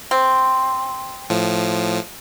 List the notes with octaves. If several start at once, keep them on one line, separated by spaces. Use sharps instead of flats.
C4
A2 F3